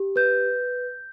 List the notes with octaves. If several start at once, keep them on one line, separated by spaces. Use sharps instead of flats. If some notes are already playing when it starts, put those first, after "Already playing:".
Already playing: G4
B4 G6